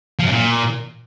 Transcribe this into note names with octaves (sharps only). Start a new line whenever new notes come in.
F3
F#2
A#2